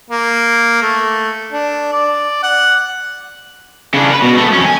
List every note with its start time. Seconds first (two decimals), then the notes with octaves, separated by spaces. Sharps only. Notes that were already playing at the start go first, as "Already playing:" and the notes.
0.10 A#3
0.82 A3
1.53 D4
1.92 D5
2.43 F#5
3.94 C#3 D4
4.10 A#4 B4
4.22 B2
4.38 A3 B3
4.53 F2 C#4
4.65 G#5